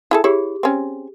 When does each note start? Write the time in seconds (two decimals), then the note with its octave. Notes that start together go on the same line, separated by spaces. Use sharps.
0.11 E4 G#4 A4
0.24 E4 G4 G#4 C#5
0.63 C4 C#4